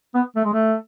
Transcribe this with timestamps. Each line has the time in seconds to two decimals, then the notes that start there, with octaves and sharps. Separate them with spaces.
0.15 B3
0.36 A3
0.45 G#3
0.54 A3